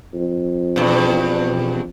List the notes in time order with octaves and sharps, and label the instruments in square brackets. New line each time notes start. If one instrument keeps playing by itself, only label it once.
[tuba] F2
[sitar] E2 G2 [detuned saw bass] B2